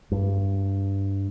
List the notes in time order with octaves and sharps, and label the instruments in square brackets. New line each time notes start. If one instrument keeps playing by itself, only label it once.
[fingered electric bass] G2